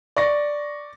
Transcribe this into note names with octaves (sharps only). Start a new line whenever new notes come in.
D5 C#6 A#6